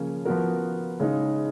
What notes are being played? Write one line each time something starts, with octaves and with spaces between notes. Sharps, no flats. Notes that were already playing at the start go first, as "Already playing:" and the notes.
Already playing: C#3 F3 A#3 C#4
F3 B3 F#4 A#4
C#3 G#3 D#4